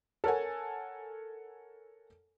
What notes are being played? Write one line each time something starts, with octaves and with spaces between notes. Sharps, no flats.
A4 A#4 C#5 F#5 G#5